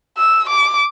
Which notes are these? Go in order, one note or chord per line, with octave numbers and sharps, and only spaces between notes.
E6
D6